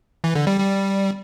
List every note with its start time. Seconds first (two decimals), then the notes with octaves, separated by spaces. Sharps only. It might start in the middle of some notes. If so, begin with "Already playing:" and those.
0.24 E3
0.35 D3
0.47 G3
0.59 G3